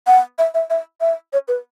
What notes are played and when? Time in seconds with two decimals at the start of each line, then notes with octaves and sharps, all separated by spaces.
0.07 F#5
0.38 E5
0.54 E5
0.70 E5
1.01 E5
1.33 C#5
1.48 B4